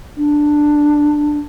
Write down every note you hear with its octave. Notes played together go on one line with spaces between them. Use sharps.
D4